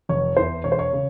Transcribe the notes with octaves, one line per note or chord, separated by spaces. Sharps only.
F1 C#5
E2 E3 C5
E1 C#5
C5
C#5
C#3